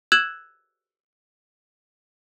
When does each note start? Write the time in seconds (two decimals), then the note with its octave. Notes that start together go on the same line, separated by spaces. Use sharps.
0.12 E6 F#6 G#6 E7 F#7